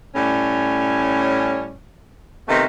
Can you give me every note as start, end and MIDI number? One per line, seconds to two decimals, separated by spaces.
0.15 1.73 45
0.15 1.73 55
0.15 1.73 61
2.49 2.64 48
2.49 2.64 51
2.49 2.64 57
2.49 2.64 59